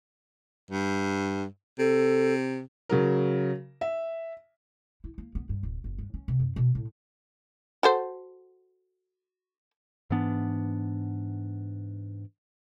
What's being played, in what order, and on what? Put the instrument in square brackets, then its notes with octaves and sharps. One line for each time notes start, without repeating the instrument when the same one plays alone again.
[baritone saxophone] G2
[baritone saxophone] C3 [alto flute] A4
[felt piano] C#3 F#3 A#4
E5
[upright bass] E4
A#3
B3
G2
D1
F#1
G2
C#4
C3
F#2
B2
A2
[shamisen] F#4 A4 C5
[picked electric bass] G#2 E3 B3 D4